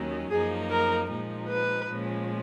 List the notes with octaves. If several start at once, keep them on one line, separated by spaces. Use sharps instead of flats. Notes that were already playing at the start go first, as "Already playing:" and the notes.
Already playing: D#2 D#3 F#3 C#4
F#2 F3 A#3 D#4 G#4
A#4
A#2 F3 G#3 D#4
B4
A#2 F3 G#3 C#4